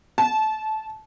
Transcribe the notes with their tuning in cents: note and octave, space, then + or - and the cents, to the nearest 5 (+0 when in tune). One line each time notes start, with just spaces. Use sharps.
A5 -20